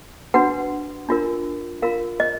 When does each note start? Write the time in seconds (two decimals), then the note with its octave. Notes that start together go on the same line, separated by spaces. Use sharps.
0.34 D4 F#4 B4 F#5
1.09 D4 F4 A#4
1.82 F4 A#4 F5
2.20 D#5